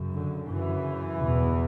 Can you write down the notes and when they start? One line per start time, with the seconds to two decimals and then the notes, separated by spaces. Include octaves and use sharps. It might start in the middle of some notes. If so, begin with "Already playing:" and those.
Already playing: F#2 C#3
0.13 D3
0.49 F#2 C#3 E3
1.22 E2 B2